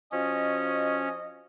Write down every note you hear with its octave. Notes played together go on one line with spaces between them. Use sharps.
F3 C#4 F#4 D#5